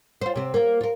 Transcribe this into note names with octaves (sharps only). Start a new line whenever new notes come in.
F4 C5
C3 C4
A#3 F4
F4 A#4